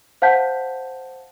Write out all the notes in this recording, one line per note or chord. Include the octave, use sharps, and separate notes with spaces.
C5 F5 F#5 A5 G6 B6